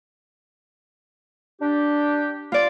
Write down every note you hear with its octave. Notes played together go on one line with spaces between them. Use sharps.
D4 G4
F4 D5